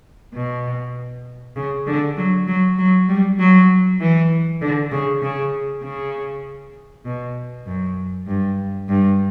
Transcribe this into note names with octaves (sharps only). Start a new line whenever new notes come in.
B2
C#3
D3
F#3
F#3
F#3
G3
F#3
E3
D3
C#3
C#3
C#3
B2
F#2
G2
G2